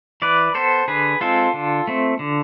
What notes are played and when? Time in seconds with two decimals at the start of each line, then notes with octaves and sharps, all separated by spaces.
0.22 E3 B4 D5
0.55 B3 A4 C5
0.88 D3 G#4 B4
1.21 G#3 C4 F4 A4
1.54 D3
1.88 A3 C4
2.19 D3